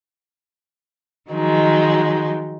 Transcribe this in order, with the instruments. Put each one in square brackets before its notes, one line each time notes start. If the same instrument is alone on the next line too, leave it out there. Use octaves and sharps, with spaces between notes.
[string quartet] D#3 F3 F#3 G#3 D#4